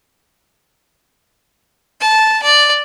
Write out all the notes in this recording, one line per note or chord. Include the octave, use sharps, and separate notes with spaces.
A5
D5